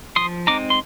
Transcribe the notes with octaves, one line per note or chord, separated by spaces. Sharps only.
F3 C6 D#6
G#3 C4 D#4 A#5 D6
C6